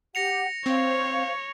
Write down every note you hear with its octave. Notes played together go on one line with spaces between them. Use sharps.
G4 F#5 A#6 C#7 F7
C4 C5 C#5 F5